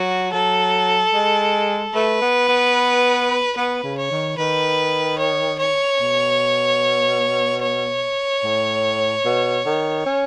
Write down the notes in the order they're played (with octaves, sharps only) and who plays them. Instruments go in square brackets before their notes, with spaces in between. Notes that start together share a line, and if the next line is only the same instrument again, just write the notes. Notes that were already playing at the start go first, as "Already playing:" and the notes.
Already playing: [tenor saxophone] F#3 [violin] F#4
[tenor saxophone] F#3 [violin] A4
[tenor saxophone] G#3
[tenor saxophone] A3 [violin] B4
[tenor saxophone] B3
B3
[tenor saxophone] B3 [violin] B4
[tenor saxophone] C#3
[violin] C#5
[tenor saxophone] D#3
[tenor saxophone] D#3 [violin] B4
[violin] C#5
C#5
[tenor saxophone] B2
[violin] C#5
[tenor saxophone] A2
B2
D#3
C#4